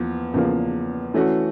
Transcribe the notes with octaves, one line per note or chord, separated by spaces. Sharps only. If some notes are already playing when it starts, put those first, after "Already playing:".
Already playing: E2 F3 A#3
E2 C#3 F3 A#3
E3 A3 C#4 F#4